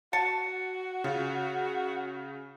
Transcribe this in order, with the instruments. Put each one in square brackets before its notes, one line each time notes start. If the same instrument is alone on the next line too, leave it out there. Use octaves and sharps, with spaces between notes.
[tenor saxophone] F#4 [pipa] A5 [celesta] C#7
[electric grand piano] C#3 [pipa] F4